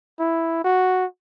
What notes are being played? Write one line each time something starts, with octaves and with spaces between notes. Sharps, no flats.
E4
F#4